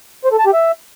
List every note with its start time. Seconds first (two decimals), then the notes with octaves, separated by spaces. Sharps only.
0.24 C5
0.32 A4
0.39 A5
0.46 G4
0.53 E5